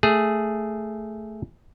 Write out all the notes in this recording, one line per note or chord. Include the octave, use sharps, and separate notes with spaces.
A3 G#4